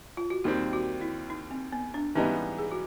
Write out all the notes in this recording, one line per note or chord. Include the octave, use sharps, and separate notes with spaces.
F4
F#4
D#2 D#3 G3 C4 G4
F#4
E4
D#4
C4
B3
D4
G#2 E3 G3 B3 C#4 D#4
G4
G#4
F#4